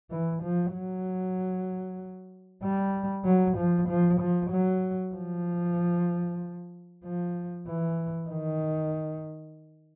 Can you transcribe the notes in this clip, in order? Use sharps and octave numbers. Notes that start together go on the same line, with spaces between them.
E3
F3
F#3
G3
F#3
F3
F3
F3
F#3
F3
F3
E3
D#3